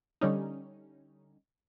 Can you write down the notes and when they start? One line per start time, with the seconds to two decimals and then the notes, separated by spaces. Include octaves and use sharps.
0.21 D3 G3 C#4 D#4